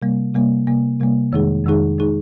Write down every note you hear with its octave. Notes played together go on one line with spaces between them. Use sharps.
C3 G3 A#3
C3 G3 A#3
C3 G3 A#3
C3 G3 A#3
F2 D#3 G#3 D#4 G#4
F2 D#3 G#3 D#4 G#4
D#3 G#3 D#4 G#4